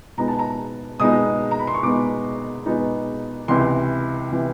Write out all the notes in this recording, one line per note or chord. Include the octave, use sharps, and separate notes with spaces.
B2 G#3 B3 D#4 A#5
A5
A#5
B2 G#3 B3 D#4 D#6
A#5
B5
C6
C#6
B2 G#3 B3 D#4 D6
B2 G#3 B3 D#4
C#2 C3 E3 C6
C3 E3